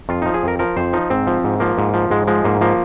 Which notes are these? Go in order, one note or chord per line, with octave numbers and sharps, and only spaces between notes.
F2 F4
F3 D#4
G#4
F2 A#4
F3 A#4
F2 C5
F3 D#4
G#2 C4
F3
G#2
F3 A#3
G#2
F3
G#2 G#3
F3 G#3
G#2 A#3
F3 A#3